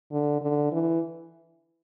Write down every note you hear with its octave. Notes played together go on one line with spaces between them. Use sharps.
D3
D3
E3